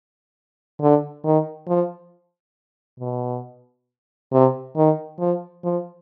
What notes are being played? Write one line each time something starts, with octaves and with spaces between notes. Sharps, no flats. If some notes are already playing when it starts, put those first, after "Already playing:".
D3
D#3
F3
B2
C3
D#3
F3
F3